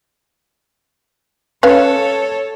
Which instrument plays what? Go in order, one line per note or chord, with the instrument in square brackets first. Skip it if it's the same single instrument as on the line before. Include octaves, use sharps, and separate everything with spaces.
[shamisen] C#4 B4 F5 [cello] A4 C#5